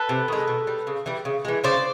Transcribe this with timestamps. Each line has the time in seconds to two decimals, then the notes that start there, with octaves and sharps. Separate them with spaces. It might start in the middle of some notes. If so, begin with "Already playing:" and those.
Already playing: A4 B4
0.09 C3
0.28 D#3 G#3
0.48 B2
0.67 G3
0.87 C#3
1.06 E3 G3
1.25 C#3
1.45 E3 G#3
1.64 C#3 C5 D5